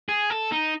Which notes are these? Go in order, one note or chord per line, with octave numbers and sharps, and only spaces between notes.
G#4
A4
D#4